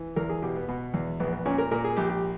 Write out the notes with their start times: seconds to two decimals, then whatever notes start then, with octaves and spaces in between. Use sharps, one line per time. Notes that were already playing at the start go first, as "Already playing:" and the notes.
Already playing: E3
0.16 E2 A#4
0.29 G#4
0.42 B2 G4
0.56 B3
0.68 B2 B3
0.94 E2
1.20 A#1 B3
1.33 B3
1.46 A#2 C#4
1.58 A#4
1.71 A#2 A#4
1.84 G#4
1.97 A#1 G4
2.10 G4